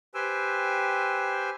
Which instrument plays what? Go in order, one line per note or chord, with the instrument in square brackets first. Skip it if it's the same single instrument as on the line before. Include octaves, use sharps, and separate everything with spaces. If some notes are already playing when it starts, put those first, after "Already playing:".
[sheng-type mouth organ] G4 B4 C5 G5 G#5 E6